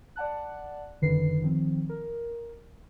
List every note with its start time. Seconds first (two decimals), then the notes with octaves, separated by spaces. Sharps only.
0.16 D5 F#5 A5 F#6
1.02 G1 F#2 D3 D#3 B4 C7
1.41 D#3 F3 C4
1.89 A#4